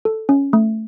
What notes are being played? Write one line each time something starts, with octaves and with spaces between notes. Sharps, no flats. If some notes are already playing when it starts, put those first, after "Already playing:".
A4
C#4
A3